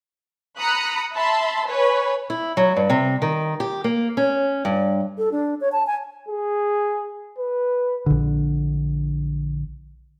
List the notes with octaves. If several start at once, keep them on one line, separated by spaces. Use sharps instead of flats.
A#5 B5 D#6 F#6 C#7
E5 A5 B5 C6
B4 C#5 G#5
E4
F#3
G2
C3
D#3
G4
A#3
C#4
G2
A4
D4
C#5
A5
G#5
G#4
B4
A#1 D3